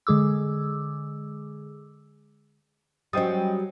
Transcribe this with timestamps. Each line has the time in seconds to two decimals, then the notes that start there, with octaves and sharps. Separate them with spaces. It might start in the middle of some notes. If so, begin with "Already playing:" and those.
0.07 D3 G#3 G#4 D6 E6
3.13 F#3 G3 C#4 C5 D#5 G5 D#6 A6